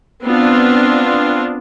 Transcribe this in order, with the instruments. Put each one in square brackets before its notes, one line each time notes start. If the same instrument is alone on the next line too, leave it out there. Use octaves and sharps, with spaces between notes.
[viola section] B3 C4 D4 F4